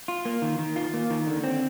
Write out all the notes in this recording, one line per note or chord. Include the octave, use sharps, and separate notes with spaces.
F4
A#3
D#3
D#3
F4
A#3
D#3
D3
C4